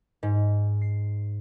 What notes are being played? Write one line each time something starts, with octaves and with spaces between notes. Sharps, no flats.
G#2
C7